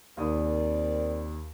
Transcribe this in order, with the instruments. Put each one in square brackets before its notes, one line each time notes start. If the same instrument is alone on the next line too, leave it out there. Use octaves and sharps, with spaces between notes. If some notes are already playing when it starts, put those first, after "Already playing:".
[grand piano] D#2 D#6 [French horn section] C4 A#4 D5